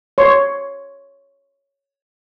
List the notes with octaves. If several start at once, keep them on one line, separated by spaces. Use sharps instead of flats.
C#5 C6